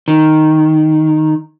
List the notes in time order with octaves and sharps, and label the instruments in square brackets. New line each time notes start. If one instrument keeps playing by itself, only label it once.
[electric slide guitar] D#3